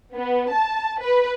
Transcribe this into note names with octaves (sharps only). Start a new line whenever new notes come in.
B3
A5
B4